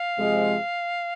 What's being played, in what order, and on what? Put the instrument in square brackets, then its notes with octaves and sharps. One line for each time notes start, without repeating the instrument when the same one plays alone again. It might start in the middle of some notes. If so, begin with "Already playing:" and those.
Already playing: [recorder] F5
[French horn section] C3 F3 G#3